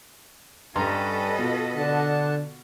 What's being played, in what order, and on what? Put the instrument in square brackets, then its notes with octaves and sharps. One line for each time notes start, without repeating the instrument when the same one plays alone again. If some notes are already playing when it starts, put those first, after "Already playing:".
[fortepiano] G2 A#5 C6 [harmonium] G3 C#4 [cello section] A4 B4 D#5
[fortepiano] B2 F4
[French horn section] D3 [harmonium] D4 F#5 A5